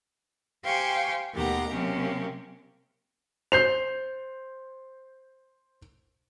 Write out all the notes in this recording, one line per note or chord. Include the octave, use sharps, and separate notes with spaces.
G4 C5 F5 G5 G#5 C#6
D#2 B2 A3 G4 F#5 A#5
C3 F#3 A#3 C#4 G4
C5 G6 C7 F7